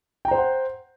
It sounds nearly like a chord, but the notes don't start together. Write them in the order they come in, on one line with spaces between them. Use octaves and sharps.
G5 A#5 C5 C6 F#5